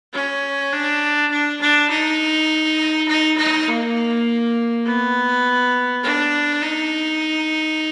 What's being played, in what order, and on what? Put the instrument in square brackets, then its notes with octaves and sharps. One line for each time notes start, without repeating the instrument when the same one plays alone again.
[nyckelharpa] C#4
D4
D4
D4
D#4
D#4
D#4
A#3
B3
D4
D#4